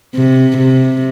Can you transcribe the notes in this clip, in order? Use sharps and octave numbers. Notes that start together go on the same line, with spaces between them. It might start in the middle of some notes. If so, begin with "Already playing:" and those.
C3
C3